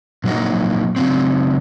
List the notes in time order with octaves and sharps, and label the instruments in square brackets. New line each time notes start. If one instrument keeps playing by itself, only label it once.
[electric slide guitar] A#2 F#3 A#3 D#4
C#3 F#3 C4